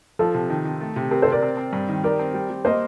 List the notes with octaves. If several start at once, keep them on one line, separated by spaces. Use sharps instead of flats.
F3 F4 A4
C3
D#3
D#3
A3
C3
C4 G4 A#4
A4 C5
C3
A#4 D5
C4
C4
G2
D#3
G4 A#4 D5
C4
G3
G3
A#3 C5 D#5